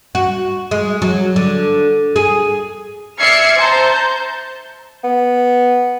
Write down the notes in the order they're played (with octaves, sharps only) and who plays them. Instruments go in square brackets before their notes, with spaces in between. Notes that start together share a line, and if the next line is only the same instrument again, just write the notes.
[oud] F#4
G#3
F#3
D3
G#4
[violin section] D5 E5 F6 G#6 C7 C#7
C5 A5 A#5 G6
[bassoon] B3